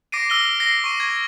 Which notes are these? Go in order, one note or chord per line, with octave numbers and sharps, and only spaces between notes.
D6 A#6 C7 D7 D#7
E6 F6 A#6 G7
A#6 C7
C#6 D#7
G#6